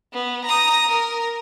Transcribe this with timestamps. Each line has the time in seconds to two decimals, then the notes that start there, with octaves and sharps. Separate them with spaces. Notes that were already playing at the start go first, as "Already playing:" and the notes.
0.13 B3
0.45 A#5 D#6
0.89 A#4